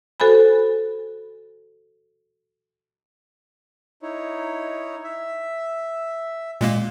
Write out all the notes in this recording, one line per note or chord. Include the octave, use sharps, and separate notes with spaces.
F#4 A4 C5 G#5 B5
D#4 E4 C#5
E5
A#2 G#3 A#3